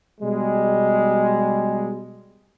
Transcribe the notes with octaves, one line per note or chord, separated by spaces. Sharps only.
B2 G3 G#3